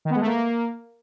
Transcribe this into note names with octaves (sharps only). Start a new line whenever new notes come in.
D#3
B3
G#3
A3
A#3